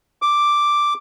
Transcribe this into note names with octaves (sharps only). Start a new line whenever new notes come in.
D6